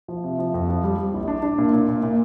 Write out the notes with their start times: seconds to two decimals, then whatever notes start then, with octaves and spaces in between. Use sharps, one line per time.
0.08 F3
0.24 C3
0.39 F3
0.54 F2
0.69 F3
0.84 G3
0.98 G3
1.13 A#1
1.28 D4
1.43 D4
1.58 A#2
1.73 A#2
1.88 A#2
2.03 A#2